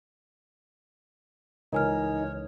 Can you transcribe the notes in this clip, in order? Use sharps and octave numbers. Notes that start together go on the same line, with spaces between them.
C#2 E3 D#4 A#4 C#5 G#5 F6